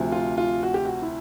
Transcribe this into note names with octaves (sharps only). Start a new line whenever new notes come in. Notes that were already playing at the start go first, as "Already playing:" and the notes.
Already playing: D2 C3 F3
F4
F4
F#4
G4
F#4
E4